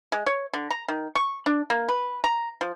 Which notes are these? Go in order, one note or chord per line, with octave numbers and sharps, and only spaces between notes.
G#3
C#5
D3
A#5
D#3
C#6
D4
A#3
B4
A#5
F3